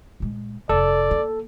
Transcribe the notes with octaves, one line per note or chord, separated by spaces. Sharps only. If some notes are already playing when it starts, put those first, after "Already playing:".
A#2 G#3
F1 A4 D5
A#3